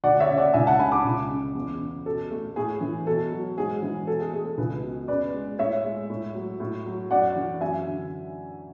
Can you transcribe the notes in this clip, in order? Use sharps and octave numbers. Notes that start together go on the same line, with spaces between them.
D2 D5 F#5
C#5 E5
C#3
D5 F#5
C#2 E5 G#5
F#5 A5
C#3 G#5 B5
B5 D6
C#2
C#3
E2
C#3
B2 A4
A3
A2 G#4
E3
B2 A4
F#3
G#2 G#4
E3
B2 A4
G#4
A3 G#4
A4
C#2 G#4 B4
B2
C#3 B4 D5
G#3
A2 C#5 E5
G#3
A2
F#3
A2
F#3
F#2 D5 F#5
E3
F#2 E5 G#5
D3